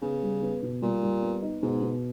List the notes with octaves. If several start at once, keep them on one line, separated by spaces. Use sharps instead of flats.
C#3 B3
G3
B3
B2
A#2 G3
G3
B3
D#4
G#2 B2
B2